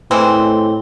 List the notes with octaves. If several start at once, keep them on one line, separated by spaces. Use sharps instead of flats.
A2 E3 G#3 C4